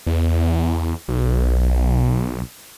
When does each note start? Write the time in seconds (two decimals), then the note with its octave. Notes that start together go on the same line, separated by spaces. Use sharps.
0.06 E2
1.08 B1